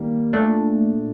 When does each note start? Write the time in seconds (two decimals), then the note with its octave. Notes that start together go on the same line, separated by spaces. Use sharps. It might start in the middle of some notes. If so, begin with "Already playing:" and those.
Already playing: D#3 G3 A#3
0.33 A#2 A3 D4